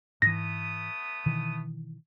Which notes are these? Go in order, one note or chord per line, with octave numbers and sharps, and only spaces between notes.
G#2 E3 A3 B3 D#6 A#6
B2 D#3 E3